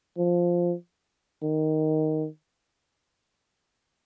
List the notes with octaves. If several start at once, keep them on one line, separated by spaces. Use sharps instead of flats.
F3
D#3